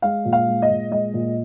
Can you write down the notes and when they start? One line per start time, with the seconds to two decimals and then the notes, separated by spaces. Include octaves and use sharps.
0.02 G#3 F5
0.25 A#2
0.33 F5
0.48 G#3
0.62 D#5
0.70 A#2
0.91 G#3 D#5
1.14 A#2